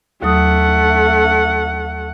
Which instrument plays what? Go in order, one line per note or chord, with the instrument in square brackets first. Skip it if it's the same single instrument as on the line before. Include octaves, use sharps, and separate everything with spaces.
[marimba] D#2 F#3 D#6 [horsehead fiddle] A3 F#5